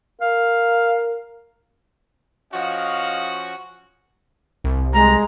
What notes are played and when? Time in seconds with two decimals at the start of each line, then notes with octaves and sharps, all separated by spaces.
0.21 A#4 F5
2.53 F3 C#4 F#4 D#5 F5
4.64 C2
4.94 G#3 A#5